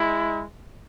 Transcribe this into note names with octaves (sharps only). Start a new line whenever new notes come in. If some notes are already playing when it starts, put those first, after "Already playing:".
Already playing: G#3 E4